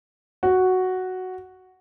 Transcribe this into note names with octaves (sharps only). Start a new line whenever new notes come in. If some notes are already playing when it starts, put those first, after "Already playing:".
F#4